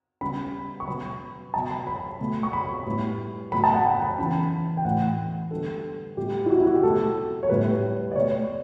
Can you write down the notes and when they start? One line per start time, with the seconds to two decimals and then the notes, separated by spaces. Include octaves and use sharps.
0.21 C#3 G3 B3 B5
0.80 C#6
0.88 B2 F#3 B3 B5
1.54 B2 F#3 B3 A5
1.71 B5
1.87 B5
2.20 B2 A3
2.43 C#6
2.53 B5
2.86 A2 G3 B3
3.52 A2 F#3 A3 B5
3.64 A5
3.74 F#5
3.85 G5
4.02 B5
4.18 C#3 E3 B3 B5
4.77 G5
4.85 A2 E3 A3 F#5
5.51 D3 G3 B3 A4
6.17 A2 G3 B3 G4
6.46 E4
6.50 F#4
6.58 E4
6.67 F#4
6.75 G4
6.83 B2 F#3 A3 A4
7.43 C#5
7.49 A2 G3 B3 B4
8.12 D5
8.16 B2 A3 C#5